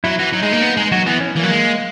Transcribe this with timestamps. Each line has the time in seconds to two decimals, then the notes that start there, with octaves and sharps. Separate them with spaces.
0.04 F#3 E4
0.19 E3 F#4
0.33 F#3 D#4
0.43 G#3
0.53 A#3
0.63 B3
0.77 G#3
0.92 F#3 F#4
1.06 E3 B3
1.20 C#4
1.35 E3 A#3
1.43 F#3
1.50 G#3